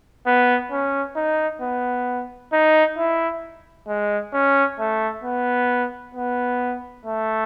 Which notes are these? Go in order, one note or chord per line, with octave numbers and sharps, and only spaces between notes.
B3
C#4
D#4
B3
D#4
E4
G#3
C#4
A3
B3
B3
A3